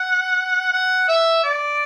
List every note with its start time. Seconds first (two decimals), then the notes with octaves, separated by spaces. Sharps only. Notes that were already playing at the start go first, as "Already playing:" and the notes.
Already playing: F#5
0.72 F#5
1.08 E5
1.44 D5